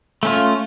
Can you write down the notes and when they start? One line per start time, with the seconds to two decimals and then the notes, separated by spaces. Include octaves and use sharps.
0.23 A3 C#4 F4